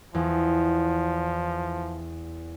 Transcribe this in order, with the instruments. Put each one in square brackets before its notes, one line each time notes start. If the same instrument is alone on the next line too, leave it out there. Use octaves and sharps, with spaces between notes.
[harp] E2 [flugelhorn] F3